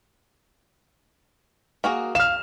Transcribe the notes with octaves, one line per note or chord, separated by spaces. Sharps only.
A#3 F#4 G#4
F5 F6 E7